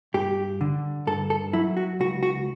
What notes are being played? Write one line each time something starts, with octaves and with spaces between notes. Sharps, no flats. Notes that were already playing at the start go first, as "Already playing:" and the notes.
G2 G4
D3
G2 A4
A4
F#3 E4
F#4
C#2 F#4
F#4